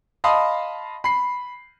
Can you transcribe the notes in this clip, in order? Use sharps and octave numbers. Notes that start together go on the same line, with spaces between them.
D#5 F5 A5 B5 C6 D#6
B5 C7